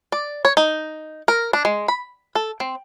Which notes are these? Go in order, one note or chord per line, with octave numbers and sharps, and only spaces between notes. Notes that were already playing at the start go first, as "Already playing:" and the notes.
D5
C#5
D#4
A#4
D4
G#3
B5
A4
C4